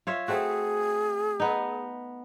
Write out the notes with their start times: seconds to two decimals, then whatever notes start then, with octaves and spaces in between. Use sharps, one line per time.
0.07 F4 C#5 E5
0.28 A3 C4 F#4 G#4
1.40 B3 D#4